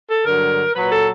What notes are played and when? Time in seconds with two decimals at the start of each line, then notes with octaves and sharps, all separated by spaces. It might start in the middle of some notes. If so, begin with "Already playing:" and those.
0.09 A4
0.25 G2 D3 F#3 A#4
0.74 A#2 F#3 B4
0.90 A4